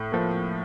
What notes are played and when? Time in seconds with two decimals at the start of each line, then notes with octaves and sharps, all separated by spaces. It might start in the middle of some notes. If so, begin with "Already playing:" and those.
Already playing: A2
0.12 F3 A#3